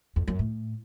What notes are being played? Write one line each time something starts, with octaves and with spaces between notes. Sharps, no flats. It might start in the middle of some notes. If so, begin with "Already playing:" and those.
F2
F#2
A2